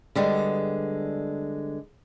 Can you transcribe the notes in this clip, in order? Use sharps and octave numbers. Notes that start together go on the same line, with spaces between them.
D3 G3 G#3 B3